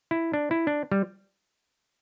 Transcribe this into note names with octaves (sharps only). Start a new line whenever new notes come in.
E4
D4
E4
D4
G3